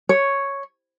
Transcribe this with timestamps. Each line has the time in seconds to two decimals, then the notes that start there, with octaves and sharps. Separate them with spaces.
0.09 C#5